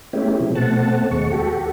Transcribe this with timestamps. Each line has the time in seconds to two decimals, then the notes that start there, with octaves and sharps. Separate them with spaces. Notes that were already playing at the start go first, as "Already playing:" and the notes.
0.13 G#3 A3 B3 C#4 E4 G4
0.40 C3 F3
0.55 B2 A3 C4 F#5 A5
1.11 D#2 G#3 C#6
1.32 F#4 G4 A4